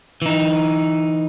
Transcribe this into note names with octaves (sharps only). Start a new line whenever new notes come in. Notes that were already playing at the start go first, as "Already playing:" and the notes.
E3 D#4